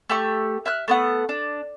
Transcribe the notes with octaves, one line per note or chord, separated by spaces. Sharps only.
A3 G4 C#6
E5 F6 F#6
A3 B3 F#5
D4